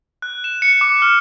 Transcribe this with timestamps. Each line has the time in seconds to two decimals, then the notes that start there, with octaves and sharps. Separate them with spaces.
0.22 F#6
0.44 E7
0.62 C#7
0.81 D6
1.02 F6